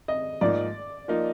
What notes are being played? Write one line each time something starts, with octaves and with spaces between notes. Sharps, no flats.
D#5
G#2 F3 A#3 D#4 D5
F3 A#3 D#4